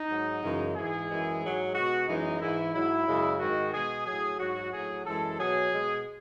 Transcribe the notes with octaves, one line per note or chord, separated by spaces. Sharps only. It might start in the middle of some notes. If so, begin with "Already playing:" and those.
Already playing: D#4
G#2 F#3
F#2 C#3 E3 G#3
G#2 E3 G#3 G#4
F#2 E3 G#3
G#2 F#3
B2 G#3 F#4
F#2 E3 G#3 D#4
G#2 E3 G#3 E4
G#2 F#3 E4
F#2 C#3 G#3
G#2 D#3 G#3 F#4
B2 G#3 G#4
A2 F#3 G#4
G#2 F#3 F#4
A2 F#3 G#4
F#2 E3 G#3 A4
B2 F#3 G#4
B2 G#3